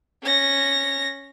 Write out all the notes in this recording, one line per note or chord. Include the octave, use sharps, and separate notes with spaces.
C#4 A#6